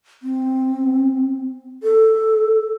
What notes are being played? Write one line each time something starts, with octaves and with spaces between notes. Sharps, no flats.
C4
A4